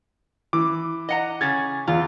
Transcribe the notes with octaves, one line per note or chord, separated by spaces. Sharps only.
E3 D6
D#5 F#5 A#5
C#3 C#4 G#4 G#6 A6
E2 F4